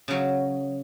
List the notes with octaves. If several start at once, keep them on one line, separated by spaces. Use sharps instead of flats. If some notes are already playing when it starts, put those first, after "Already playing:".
C#3 F#3